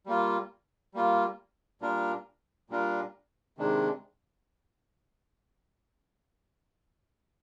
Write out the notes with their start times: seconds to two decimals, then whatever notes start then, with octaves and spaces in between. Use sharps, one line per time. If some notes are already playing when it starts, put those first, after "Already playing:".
0.06 G3 A#3 F4
0.94 G3 A#3 F4
1.81 A#2 G3 D4 F4 A#4
2.70 A#2 G3 D4 F4 A#4
3.58 C3 D#3 G#3 D4